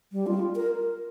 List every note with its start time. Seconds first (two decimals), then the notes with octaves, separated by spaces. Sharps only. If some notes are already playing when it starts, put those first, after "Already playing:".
0.12 G3
0.27 F4
0.56 A#4